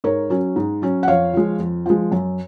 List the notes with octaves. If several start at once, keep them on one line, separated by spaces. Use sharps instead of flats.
G#2 A#4 C#5
F#3 C#4
G#2
F#3 C#4
F#5
F2 C#5 F5
F3 G#3
F2
F3 G#3
F#2